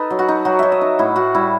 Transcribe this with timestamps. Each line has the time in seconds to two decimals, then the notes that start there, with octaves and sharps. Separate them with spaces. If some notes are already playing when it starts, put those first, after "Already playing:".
Already playing: D#4 A4 B4
0.10 F#3
0.19 F#4
0.28 D#4
0.45 F#3 F#4
0.59 F#3 E5
0.72 D#5
0.81 D#4
0.99 A2 E4
1.16 A2 F#4
1.34 G3 E4